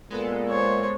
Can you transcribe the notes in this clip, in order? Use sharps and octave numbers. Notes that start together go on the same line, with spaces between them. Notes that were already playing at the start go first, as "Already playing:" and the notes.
A#2 G#3 B3 A4
C5 C#5